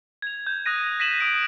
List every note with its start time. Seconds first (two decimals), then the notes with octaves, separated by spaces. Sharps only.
0.22 G#6 F7
0.47 G6
0.66 D#6 F#6 A#6 D#7
1.00 A#6 B6 D#7 E7 F#7
1.19 D#6 D7 D#7